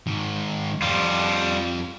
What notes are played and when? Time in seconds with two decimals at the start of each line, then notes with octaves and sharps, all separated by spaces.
0.07 G#2 D#3
0.82 F2 G3 F4